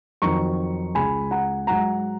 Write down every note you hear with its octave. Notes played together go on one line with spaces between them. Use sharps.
F2 D#3 F#3 A#5 C#6
C#2 C#3 G#3 G#5 B5
F#5 A#5
G#2 F#3 F#5 A#5